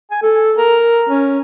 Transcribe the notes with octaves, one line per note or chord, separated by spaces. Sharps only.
G#5
A4
A#4
C#4